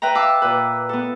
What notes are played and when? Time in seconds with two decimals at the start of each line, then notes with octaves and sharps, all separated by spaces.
0.02 B4 E5 G5 A#5
0.15 F5 A5 D6 E6
0.42 A#2 B4
0.89 B3 A4